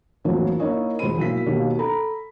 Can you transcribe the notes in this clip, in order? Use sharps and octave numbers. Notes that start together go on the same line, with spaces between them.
F2 A2 D#3 E3 F#3 A#3
A#3 D#4 E4 A#4 C#5 D#5
E1 D#3 G#3 C5 B5 D#7
B1 A#3 E4 B6
D#2 B2 A#3 D#4
A4 A#5 B5